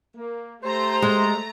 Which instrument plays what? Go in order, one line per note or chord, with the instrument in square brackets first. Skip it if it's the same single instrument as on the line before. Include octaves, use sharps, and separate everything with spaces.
[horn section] A#3
[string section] A3 A#5 [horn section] G4 C5
[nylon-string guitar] G#3